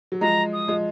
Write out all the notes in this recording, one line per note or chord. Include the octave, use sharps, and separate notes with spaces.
F#3
F3 G#3 A#5
D#6
F3 G#3